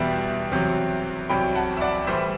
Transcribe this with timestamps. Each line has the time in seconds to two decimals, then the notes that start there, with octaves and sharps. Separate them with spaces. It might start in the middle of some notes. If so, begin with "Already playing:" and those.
Already playing: E2 B2 G3 E5 G5
0.52 E2 C3 F#3
1.29 C2 C3 F#3 G5 B5
1.55 F#5 A5
1.77 E5
1.81 D5 F#5
2.07 A2 E3 G3 C5 E5